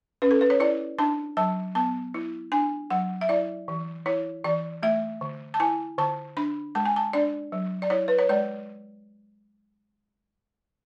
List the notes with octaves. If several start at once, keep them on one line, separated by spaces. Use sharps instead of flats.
C#4 B4
A4
B4
C#5
E4 D5
D4 A5
F#3 A5
B3 A5
E4
D4 G#5
F#3 F#5
E5
E4 D5
E3
E4 C#5
E3 D5
A3 E5
D3
A5
E4 G#5
D3 A5
D4 B5
G#3 A5
G#5
A5
D4 D5
F#3
D5
E4 C#5
B4
C#5
G#3 D5